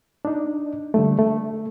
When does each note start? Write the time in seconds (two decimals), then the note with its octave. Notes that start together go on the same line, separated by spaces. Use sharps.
0.25 D4 D#4
0.94 D3 G3 A3
1.19 A3